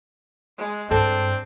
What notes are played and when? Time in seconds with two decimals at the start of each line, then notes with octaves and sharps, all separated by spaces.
0.58 G#3
0.91 G2 C4 D4 A4